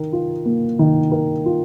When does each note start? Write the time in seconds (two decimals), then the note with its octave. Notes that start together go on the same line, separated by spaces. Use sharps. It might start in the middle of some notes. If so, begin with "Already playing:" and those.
Already playing: D#3 A#4
0.13 F4
0.45 A#3
0.79 D#3
1.12 A#4
1.46 F4